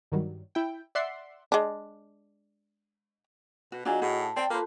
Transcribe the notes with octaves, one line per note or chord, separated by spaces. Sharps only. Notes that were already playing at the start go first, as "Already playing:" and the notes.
G2 D#3 F#3 G3
E4 G5
D5 E5 F#5 C6
G#3 D4
B2 F#4
F#3 D4 F4 F#4 G#4 D#5
A2 D#4 G#4 F#5
A5
C4 D5 G5
A#3 F4 A4 B4 C5 A5